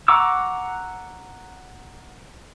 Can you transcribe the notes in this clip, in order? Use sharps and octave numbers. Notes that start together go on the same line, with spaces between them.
F#5 A#5 C#6 D6 E6